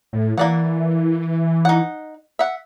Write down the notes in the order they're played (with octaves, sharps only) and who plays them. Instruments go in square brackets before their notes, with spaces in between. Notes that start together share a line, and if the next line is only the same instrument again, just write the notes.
[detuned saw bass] A2
[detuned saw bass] E3 [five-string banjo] A#3 D5 F#5
[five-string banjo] D#4 F#5
E5 F#5